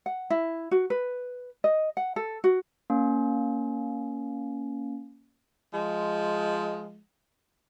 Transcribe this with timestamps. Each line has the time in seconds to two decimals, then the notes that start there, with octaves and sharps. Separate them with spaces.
0.06 F#5
0.30 E4
0.71 F#4
0.90 B4
1.64 D#5
1.97 F#5
2.16 A4
2.44 F#4
2.90 A#3 C#4
5.73 F3 G#3